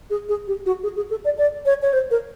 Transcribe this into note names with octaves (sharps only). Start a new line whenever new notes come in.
G#4
G#4
G4
F#4
G#4
G#4
A4
D5
D5
C#5
C#5
C5
A#4